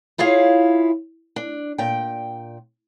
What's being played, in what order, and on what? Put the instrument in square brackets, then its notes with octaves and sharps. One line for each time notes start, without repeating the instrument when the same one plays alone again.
[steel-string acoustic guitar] E4 F4 G#4 C#5 F5
D4
A#2 G5